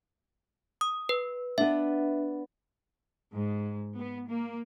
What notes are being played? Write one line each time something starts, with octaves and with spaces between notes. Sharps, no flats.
D#6
B4
B3 D4 E5
G#2
B3
A#3